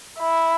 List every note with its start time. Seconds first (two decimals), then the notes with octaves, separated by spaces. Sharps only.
0.19 E4